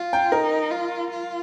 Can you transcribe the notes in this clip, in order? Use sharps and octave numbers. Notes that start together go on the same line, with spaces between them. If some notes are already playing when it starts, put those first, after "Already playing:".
Already playing: F4
G5
D#4 A#4
F4
F4